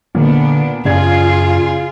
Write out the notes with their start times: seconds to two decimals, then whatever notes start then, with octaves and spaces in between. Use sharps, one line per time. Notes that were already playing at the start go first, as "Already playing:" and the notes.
0.15 A#2 D3 B3 D4
0.85 F#2 C#3 F4 G#4 D5 G#6